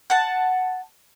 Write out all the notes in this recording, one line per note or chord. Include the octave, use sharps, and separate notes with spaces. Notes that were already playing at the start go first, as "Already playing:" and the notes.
F#5 A5